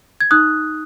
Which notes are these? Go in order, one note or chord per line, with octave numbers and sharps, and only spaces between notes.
G#6
D#4 D#6 F#6